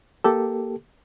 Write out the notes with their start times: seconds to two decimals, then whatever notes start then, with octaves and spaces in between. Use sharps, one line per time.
0.24 A#3 G4 A4